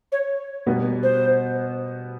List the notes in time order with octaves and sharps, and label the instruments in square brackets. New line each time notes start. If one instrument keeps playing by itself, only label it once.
[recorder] C#5
[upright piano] B2 G3 B3
[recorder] C5